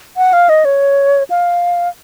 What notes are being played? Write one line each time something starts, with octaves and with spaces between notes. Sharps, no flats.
F#5
F5
D#5
C#5
F5